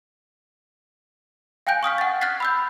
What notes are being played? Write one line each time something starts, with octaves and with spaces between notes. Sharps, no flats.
F5 G5 G#5 F#6 G6 D7
C#6 D#6 F6 B6
F#5 A6
F6 F#6 G#6 A6 B6 C7
B5 E6 G6